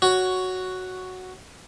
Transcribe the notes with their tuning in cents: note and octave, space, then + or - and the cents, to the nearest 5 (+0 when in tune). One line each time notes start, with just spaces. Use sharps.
F#4 +0 C#5 +5